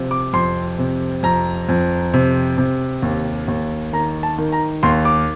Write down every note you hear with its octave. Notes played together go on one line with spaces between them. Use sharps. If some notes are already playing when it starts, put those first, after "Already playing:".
Already playing: C3 F3
D6
F2 C6
C3
F2 A#5
F2
C3
C3
D#2
D#2
D#3 A#5
A5
D#3
A#5
D#2 C6
D6